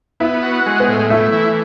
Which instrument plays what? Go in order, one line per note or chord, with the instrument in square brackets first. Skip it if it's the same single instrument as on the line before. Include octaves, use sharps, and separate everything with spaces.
[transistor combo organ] B3 [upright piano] E4
[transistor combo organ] F#4
G#3
[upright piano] B3
[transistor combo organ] A2
[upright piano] A3 [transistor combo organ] E4
[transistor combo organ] E3